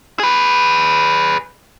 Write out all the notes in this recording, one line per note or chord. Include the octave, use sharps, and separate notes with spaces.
G#4 B4